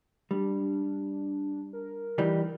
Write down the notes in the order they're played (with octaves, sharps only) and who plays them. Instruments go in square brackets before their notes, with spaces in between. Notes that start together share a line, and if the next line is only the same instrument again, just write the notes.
[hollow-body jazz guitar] G3 [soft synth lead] D4
[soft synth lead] A#4
[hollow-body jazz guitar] E3 G3 D#4